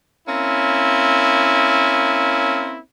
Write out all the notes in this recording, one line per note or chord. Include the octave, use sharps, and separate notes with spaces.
A#3 C4 C#4 E4